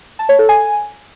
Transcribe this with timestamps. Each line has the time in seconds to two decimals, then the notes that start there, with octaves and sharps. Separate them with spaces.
0.19 A5
0.29 C#5
0.39 A4
0.49 G#5